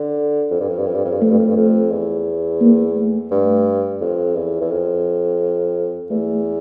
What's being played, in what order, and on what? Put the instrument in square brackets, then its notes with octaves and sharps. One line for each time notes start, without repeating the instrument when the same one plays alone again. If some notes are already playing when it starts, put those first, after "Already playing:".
Already playing: [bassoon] D3
F2
G2
F2
G2
F2
G2
F2
G2
[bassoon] F2 [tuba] A3
[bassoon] G2
F2
G2
F2
E2
[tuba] A#3
A3
[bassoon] G2
F2
E2
E2
F2
[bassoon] E2 [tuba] A3